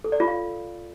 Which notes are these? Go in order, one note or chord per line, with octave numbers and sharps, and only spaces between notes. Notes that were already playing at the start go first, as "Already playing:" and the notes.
A4
D5
F4
F5